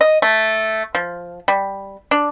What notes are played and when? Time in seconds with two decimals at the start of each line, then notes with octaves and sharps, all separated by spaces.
0.01 D#5
0.22 A3
0.95 F3
1.48 G3
2.11 D4